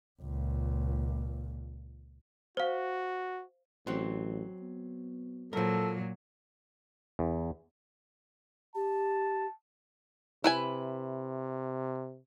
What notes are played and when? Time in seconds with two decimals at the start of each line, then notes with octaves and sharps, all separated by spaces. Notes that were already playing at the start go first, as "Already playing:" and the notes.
0.21 C#2 A#2
2.57 F#4 C5 F5
3.87 A1 F#3 C4
4.61 B3
5.53 A#2 F3 F#3 A4 A#4
7.19 E2
8.75 G4 A5
10.44 C3 E4 B4 G#5